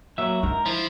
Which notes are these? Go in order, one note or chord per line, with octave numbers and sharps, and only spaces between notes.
F#3 A#3 F#4 E5
G#2 D4 A#4
F3 E4